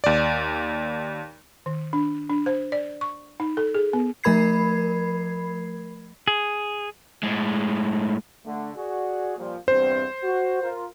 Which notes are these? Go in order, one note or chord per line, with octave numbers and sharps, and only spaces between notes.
D#2 D5
D#3
D4
D4
C5
D5
C#6
D#4
A4
G#4
B3
F3 A3 A#4 B5 G#6 C7
G#4
A2 G#3
D3 A3
F#4 G#4 D5
A#2 F3 G3
E2 G2 C4 C5
F#4
F4 A#4